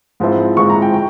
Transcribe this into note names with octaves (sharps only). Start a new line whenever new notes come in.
G#2 F3 G#3 C4 E4
G#2 F3 G#3 C4 E4 C#6
A#5
G5
G5